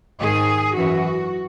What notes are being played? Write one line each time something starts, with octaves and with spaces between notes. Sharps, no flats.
G#2 D#3 G#4
F#2 E3 F#4